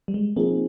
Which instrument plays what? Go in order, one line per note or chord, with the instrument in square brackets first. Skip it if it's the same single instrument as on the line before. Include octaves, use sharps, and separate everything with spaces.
[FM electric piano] G3
G#3
[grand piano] F3 C4 D#4 G#4 [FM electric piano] A#3